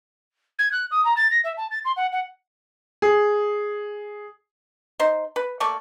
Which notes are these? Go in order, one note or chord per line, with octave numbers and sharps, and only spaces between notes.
G#6
F#6
D#6
A#5
A6
A#6
E5
A5
A6
C6
F#5
F#5
G#4
D#4 C5
B4
A3 A#3 D5 C#6